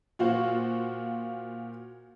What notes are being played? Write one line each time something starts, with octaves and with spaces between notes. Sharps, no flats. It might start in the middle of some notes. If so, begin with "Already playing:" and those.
A#2 F4 F#4 C5